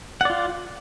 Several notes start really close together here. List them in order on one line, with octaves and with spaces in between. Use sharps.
F#5 D5 F4